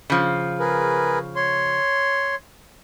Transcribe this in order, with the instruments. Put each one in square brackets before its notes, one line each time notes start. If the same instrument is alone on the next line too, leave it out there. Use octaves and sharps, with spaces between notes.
[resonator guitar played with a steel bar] C#3 F3
[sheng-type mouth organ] G#4 A#4 B4
C#5 C6